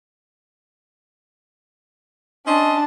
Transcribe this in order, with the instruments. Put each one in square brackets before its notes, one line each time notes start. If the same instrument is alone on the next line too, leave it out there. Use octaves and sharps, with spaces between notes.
[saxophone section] C#4 C5 D#5 [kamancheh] D4 A5